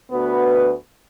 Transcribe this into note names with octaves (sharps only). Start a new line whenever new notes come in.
D2 B3 F#4 B4